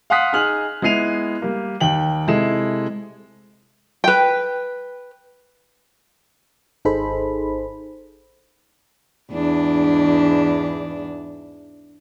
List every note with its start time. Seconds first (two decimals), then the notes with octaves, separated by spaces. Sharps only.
0.10 F5 F#5 C6 D#6 F#6 B6
0.33 D#4 G#4 F6 F#7
0.82 G#3 B3 E4 C7 D#7 F7
1.42 G3 A#3
1.81 D#2 G5 F#7
2.28 C3 G#3 E4 A4 E7
4.04 B4 G5
6.85 G#1 D#4 G#4 A4 C5 B5
9.32 E2 G#2 D4